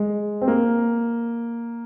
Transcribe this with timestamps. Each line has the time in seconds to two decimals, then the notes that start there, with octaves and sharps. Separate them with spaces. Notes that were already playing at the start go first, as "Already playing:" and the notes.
Already playing: G#3
0.42 C4
0.48 A#3